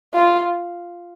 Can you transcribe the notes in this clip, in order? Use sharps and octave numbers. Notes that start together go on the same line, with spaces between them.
F4